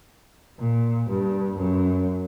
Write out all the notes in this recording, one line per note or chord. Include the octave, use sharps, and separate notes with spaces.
A#2
G2
F#2